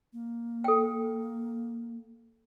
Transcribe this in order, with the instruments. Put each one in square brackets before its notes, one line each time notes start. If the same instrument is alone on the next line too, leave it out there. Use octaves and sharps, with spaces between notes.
[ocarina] A#3
[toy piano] A4 G5